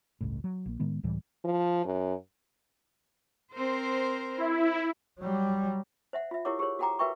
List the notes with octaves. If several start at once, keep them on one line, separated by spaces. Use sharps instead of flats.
G1 C#2 A2
F#3
A#1 A#3
A2 D#3 G#3 B3
C#2 A2 E3 G3
F3
F#2
C4 A#4 C5
E4
F#3 G3
C5 E5 F#5
F4 E5
E4 G4 A#4 C#5 F#5 D6
G4 G#4 A#4 C5 C#5
F#4 A4 F#5 G5 A#5 D6
F#4 A#4 B4 E5 G5 C#6